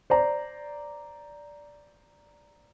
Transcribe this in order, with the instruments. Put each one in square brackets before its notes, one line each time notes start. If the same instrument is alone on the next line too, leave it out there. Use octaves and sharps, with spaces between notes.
[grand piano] C5 D5 A#5